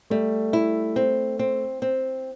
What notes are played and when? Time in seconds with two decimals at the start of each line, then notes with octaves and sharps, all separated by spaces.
0.10 G3 A3
0.53 E4
0.96 C4
1.39 C4
1.82 C4